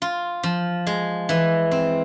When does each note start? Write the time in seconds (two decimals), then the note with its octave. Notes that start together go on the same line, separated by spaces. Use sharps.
0.02 F4
0.43 F3
0.87 G#3
1.29 E3
1.71 C4